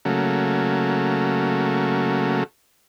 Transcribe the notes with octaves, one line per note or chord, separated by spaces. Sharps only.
C#3 F#3 A3 A#3